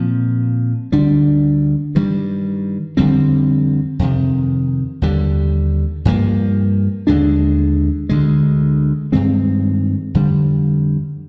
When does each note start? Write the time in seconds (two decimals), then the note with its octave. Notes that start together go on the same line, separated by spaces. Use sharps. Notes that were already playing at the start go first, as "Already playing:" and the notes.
Already playing: A#2 F3 C4
0.92 D2 D3 G3 D4
1.95 G2 D#3 G3
2.97 F2 D3 G3 C4
3.99 F2 C3 D#3
5.02 D#2 D3 G3
6.05 G2 F3 A#3
7.07 D#2 D3 G#3 D4
8.09 D2 D3 G#3
9.12 G2 D#3 G#3 C4
10.14 F2 D3 G3